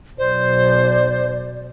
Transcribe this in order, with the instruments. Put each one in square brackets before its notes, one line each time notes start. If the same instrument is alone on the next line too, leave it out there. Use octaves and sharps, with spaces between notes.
[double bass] B1 [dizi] C5 [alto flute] D5